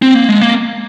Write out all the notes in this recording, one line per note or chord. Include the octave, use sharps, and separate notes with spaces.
C4
A#3
G#3
A#3